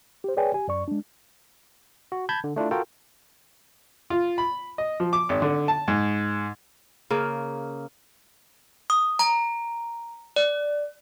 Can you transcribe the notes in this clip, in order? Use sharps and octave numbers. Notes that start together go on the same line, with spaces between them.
G4 C5
G#4 B4 C#5 D5 G5 G#5
G4 G#5
F#2 D5 C#6
G#3 D4
F#4
A5 B5 G6 G#6
D3
A3 D4 E4 F4
F4 F#4 A4 A#4 G5
F4
B5
D#5
F3
D6
G#1
D3
A5
G#2
C#3 A#3
D#6
A#5
D5